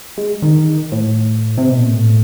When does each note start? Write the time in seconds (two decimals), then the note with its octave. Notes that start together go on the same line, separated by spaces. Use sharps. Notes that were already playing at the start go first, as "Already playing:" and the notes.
0.18 G#3
0.42 D#3
0.92 A2
1.58 C3
1.69 B2
1.80 A#2
1.90 A2